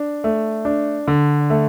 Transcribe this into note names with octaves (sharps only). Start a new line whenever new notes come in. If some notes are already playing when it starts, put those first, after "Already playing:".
Already playing: D4
A3
D4
D3
A3